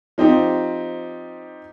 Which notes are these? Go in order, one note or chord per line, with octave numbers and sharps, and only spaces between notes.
F3 C4 D#4 G4